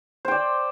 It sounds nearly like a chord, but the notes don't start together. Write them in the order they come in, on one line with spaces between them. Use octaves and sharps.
C5 G5 D5